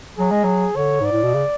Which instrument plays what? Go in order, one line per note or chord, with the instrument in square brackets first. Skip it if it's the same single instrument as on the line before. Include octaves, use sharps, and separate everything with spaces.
[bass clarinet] F#3 [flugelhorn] G#4
[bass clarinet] G#3
F#3
[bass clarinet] D3 [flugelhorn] C#5
[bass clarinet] G#2 [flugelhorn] D5
[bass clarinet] A2
B2
C#3